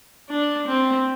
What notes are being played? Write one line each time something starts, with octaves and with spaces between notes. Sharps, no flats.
D4
C4